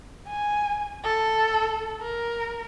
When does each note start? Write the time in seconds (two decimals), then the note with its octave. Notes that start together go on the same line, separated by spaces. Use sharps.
0.28 G#5
1.04 A4
2.01 A#4